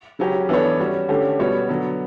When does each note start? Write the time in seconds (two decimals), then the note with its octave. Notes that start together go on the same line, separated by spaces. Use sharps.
0.19 C#3 F#3 C#4 G4
0.49 E3 B3 D4 A4 C#5
0.79 G3 C#4 F#4
1.09 D3 A3 C#4 G4
1.39 B2 G3 B3 F#4 C#5
1.69 D3 F#3 B3